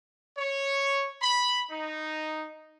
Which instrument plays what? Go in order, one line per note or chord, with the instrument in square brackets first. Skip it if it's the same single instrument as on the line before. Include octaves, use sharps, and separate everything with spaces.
[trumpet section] C#5
B5
D#4